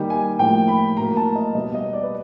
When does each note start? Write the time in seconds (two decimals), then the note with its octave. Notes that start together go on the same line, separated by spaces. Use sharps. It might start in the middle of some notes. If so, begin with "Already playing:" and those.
Already playing: D#3 G3 A#3 D#4 G5
0.10 G#5
0.39 A2 F3 A#3 G5
0.68 B5
0.97 A2 F#3 A#3 A#5
1.17 A5
1.35 D#5
1.55 B2 G3 B3 D#5
1.75 D#5
1.93 D5
2.03 B4